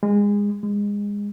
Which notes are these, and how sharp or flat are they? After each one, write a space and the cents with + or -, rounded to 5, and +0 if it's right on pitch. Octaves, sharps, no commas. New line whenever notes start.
G#3 -25
G#3 -25